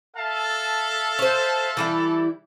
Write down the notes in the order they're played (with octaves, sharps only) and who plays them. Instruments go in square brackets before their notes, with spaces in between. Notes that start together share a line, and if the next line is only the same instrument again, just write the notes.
[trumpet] A4 [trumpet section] E5 F5 A5
[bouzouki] C5 C#5
E3 G3 E4